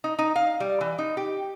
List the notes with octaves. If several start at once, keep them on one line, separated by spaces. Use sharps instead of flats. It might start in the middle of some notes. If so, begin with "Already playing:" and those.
D#4
D#4
F5
G3
E3
D#4
G4